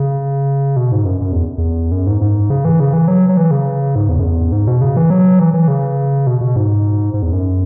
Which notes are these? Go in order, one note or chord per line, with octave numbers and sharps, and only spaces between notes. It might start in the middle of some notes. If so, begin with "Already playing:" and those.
Already playing: C#3
B2
G#2
F#2
F#2
E2
E2
F#2
G#2
G#2
C#3
E3
C#3
E3
F#3
F#3
E3
C#3
G#2
E2
F#2
E2
G#2
B2
C#3
E3
F#3
E3
E3
C#3
B2
B2
G#2
G#2
E2
F#2